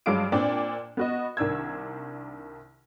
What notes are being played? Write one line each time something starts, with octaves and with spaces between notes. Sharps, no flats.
G2 F#3 G#3 F5 D6 D7
A#2 C4 D4 D5 G5
B3 F#4 D#5
C2 D#3 D4 E6 G#6